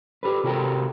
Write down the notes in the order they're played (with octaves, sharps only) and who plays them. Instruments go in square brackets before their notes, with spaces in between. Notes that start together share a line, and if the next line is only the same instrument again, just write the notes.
[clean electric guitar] G4 A4 B4
C3 F#4 G4 A4 A#4